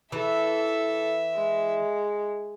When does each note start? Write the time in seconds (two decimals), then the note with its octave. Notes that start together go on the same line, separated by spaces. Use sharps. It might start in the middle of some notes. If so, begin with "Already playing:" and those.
0.12 E3 A4 E5
1.35 G#3